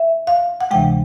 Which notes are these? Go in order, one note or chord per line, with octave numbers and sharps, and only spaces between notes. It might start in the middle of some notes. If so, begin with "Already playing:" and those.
Already playing: E5
F5
F#5
D2 C3 E3 G#3 G5